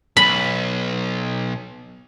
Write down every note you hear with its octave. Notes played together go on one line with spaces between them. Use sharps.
B1 F#2 B5